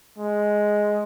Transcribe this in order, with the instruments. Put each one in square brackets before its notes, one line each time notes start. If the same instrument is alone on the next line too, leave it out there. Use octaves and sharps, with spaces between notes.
[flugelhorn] G#3